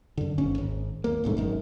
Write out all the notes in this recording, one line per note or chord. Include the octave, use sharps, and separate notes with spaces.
F#2 D3
D1 G1 D#2 C#4
G#1
D#2 A#3
D1 C2 G#2 A3
G#1 F#2 D#3